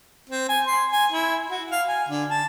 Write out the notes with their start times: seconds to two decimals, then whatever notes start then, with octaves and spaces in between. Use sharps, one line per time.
0.30 C4
0.49 G#5
0.67 C6
0.92 G#5
1.12 E4
1.50 F#4
1.71 F5
1.88 G#5
2.09 D3
2.30 A5